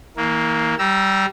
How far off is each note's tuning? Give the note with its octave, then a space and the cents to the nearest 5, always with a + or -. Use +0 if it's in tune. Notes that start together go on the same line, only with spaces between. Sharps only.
E3 -40 A#3 +0
G3 -15 A#5 +5 E6 +0